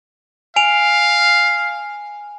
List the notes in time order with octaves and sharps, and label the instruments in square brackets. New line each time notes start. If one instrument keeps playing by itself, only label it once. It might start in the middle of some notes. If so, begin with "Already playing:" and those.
[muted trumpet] F5 [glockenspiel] G#5 D7 F7